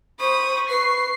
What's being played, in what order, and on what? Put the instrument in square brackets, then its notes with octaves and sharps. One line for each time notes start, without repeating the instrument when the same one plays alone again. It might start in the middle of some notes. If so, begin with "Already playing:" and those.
[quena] C5 [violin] B5 D#6 [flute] C#6
[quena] B4 [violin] C7